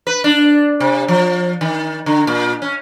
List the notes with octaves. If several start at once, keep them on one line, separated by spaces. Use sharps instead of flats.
B4
D4
C3
F3
D#3
D3
A#2
C#4